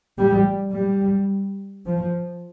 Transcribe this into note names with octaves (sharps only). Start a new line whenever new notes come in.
G3
G3
F3